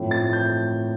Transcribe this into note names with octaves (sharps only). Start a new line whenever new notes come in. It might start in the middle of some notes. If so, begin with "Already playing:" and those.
Already playing: A2 F3 A3 C4
A6
G6